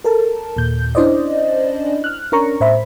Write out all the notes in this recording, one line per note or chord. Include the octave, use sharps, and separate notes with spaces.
A4 A#4 A5
D#2 A#2 G6
C#4 D4 E4 C5 D5 D#5
F6 F#6
C#4 D4 A#4 A#5 C#6
A2 C5 E5 B5